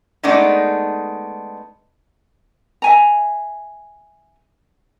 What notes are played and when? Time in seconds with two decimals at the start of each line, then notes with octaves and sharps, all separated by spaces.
0.23 G#3 A3 B3 D4 D#4
2.82 E5 G#5 A#5